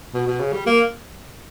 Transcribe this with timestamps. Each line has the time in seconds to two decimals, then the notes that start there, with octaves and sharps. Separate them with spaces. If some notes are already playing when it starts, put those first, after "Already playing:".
0.14 B2
0.27 B2
0.40 C#3
0.53 G3
0.66 A#3